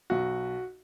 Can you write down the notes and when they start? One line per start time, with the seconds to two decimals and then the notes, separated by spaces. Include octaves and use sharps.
0.10 B1 F#4